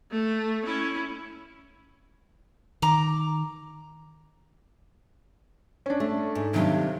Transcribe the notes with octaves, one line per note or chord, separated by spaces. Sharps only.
A3
C#4 E4
D#3 A#5 D6
C#4 D4
A3
G#2
G2 C3 D#3 F#3 D4